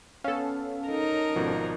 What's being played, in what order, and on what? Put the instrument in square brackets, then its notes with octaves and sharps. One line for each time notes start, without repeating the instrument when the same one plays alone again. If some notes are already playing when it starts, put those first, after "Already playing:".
[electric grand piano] B3 F5 [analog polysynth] C#4 A4
[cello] D#4 A#4
[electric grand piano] G#1 B2 F3